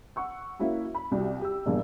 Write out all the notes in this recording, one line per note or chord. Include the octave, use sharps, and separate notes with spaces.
F#5 C#6 E6
A#3 C#4 E4 F#4
B5
C2 G3 F#4 G4
G4 E6
A#1 E2 G2 A#3